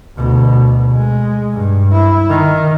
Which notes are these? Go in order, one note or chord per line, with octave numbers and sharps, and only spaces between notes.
D2 B2
G#3
G2
E4
D#3